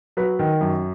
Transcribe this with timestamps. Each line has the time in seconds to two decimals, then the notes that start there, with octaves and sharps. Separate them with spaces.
0.17 F#3 B4
0.39 D#3
0.61 F#2